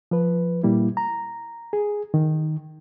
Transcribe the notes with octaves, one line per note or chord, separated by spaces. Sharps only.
F3 B4
A#2 G3 A#3 E4
A#5
G#4
D#3